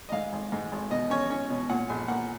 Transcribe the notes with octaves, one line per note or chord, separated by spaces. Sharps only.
D#5
G#2 F5
G#1
G#2
G#1
B2 D#5
C#4 C#5
C#4 C#5
B2
A#2 F#5
A#1 G#5
A#3 F#5